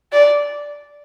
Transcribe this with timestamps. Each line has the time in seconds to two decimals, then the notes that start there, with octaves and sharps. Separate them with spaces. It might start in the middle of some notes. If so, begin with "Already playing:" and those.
0.12 D5